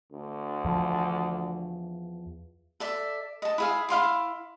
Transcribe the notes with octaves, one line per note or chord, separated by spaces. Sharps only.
D2
E2 F3
A4 D5 E5
D#5 A5
E4 G#4 F5
E4 F5 C6 D6